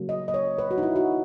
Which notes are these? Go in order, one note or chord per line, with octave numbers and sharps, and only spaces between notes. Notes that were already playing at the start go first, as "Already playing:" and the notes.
Already playing: C#3 F#3 A#3
D#5
D#5
C#5
B4
F#4
D#4
E4
F#4